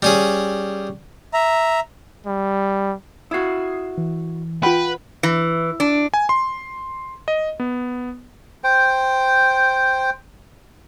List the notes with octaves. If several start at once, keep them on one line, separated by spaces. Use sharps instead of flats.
G3 C#4 G#4
E5 A#5
G3
E4 F#4 D#6 G#6 C7
E3
F4 B4 F#5 G5
E3
D4
G#5
C6
D#5
B3
C5 G5